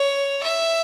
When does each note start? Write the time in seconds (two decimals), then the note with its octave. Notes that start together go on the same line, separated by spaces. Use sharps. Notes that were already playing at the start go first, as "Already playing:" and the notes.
Already playing: C#5
0.43 E5